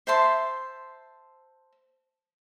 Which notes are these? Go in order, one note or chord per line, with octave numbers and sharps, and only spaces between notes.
C5 E5 A5 C6